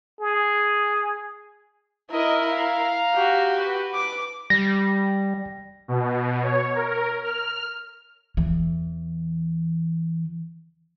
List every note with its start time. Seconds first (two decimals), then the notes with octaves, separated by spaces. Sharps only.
0.20 G#4
2.11 E4 A#4 D#5
2.45 F5 A#5
3.15 F#4 G4
3.58 B4
3.94 D6
4.50 G3 A#6
5.88 B2
6.43 C#5
6.75 A#4
7.24 F6
8.37 E2 E3